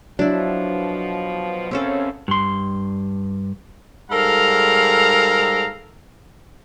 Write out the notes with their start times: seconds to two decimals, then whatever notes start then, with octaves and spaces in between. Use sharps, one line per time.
0.19 B2 F3 F#3 D4 E4
1.71 F#2 C#3 C4 C#4 A4
2.28 G2 C6
4.11 G#2 G3 A4 A#4 F5 A#5